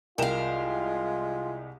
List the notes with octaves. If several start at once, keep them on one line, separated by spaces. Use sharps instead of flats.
C2 G#3 F4 A#4 F5 G5 E7